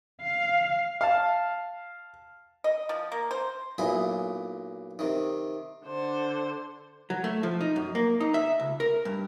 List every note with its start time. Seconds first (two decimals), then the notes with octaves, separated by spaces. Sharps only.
0.21 F5
1.01 F5 A5
2.64 D#5
2.89 F3
3.12 A#3
3.31 C5
3.78 B1 A#2 E4 G#4
4.99 C3 D#3
5.86 D3 C5
7.10 F#3
7.24 A3
7.43 F3
7.61 D#4
7.76 F#2
7.95 A#3
8.21 D#4
8.34 E5
8.60 C#2
8.80 A#4
9.05 G2